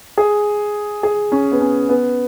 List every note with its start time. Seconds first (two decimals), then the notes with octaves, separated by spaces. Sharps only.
0.18 G#4
1.03 G#4
1.32 C#4
1.52 B3
1.60 C#4
1.89 B3